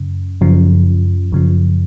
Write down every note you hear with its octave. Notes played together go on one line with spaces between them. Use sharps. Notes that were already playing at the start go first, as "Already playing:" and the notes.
Already playing: F#2 C#3
F#2 C#3 F3
F#2 C#3 F3